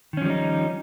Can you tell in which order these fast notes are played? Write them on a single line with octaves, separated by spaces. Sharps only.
D#3 C#4 F3 G3 D#4